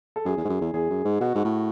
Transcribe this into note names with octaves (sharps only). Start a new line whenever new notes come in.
A4
F#2 G#4
E2
G#2
F#2
E2
E2 G#4
F#2
G#2
B2 F#4
G#2
A2